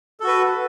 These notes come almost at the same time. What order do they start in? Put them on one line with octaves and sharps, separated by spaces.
A4 F#4 B4